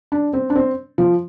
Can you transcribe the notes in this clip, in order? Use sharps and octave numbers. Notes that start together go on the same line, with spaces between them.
D4
C4
D4
C4
F3